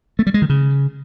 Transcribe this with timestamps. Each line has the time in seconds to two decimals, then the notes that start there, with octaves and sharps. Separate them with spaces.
0.19 A3
0.27 G3
0.34 G#3
0.42 D#3
0.49 C#3